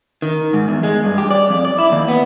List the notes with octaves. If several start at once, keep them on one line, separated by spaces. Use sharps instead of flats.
D#3
G#2
E2
G#3
G2
G4
D5
F2
D5
E4
D#2
B3